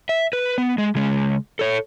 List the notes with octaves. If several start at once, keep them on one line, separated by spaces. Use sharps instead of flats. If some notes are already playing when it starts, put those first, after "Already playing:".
E5
B4
B3
G#3
C#3 G#3
A4 C#5